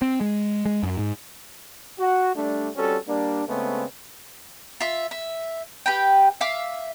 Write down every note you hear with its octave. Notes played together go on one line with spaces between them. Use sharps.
C4
G#3
G#3
F#2
G#2
F#4
G3 A3 D4
G3 C4 C#4 F#4 A4
G3 A#3 D4
C#3 G#3 A3 B3 C4
F4 E5
E5
G4 B4 G5
E5 F5 D6